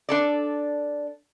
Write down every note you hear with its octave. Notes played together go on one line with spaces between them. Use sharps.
D4 A4 D5